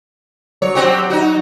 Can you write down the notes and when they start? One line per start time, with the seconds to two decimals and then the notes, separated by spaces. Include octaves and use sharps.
0.62 F#3 C#5
0.75 C4 F#4 G4
1.10 D#4 F#4